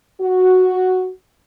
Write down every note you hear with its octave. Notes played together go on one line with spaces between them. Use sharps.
F#4